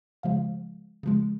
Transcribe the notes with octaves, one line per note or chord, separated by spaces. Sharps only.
C#3 F3 G#3 F5
C#3 F3 G#3